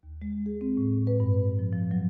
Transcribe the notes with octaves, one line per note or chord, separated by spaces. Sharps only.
D#2
G#3
G#4
C4
A2
B4
G2
F3
F3
F#3